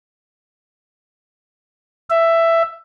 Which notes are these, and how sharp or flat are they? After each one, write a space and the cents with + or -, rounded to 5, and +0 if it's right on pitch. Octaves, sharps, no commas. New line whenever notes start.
E5 +10